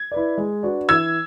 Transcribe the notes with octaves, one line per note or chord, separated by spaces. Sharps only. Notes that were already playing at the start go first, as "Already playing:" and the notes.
Already playing: G#6
E4 B4 D5
G#3
D4 F#4 B4
E3 E6 G#6